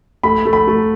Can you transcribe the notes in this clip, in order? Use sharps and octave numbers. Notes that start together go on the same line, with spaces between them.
A3 B5
A3
B5
A3